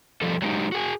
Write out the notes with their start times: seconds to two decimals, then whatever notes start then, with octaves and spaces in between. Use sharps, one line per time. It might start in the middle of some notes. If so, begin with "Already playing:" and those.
0.22 F3 G3 A4
0.42 F#3 G#3 D#4 G4
0.72 F#4 G#4 G#5